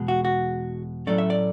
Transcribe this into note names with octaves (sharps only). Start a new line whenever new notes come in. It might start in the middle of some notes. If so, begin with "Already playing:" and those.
Already playing: E2 B2 G#3
F#4
F#4
A2 F#3 A3 C#4 D5
E5
D5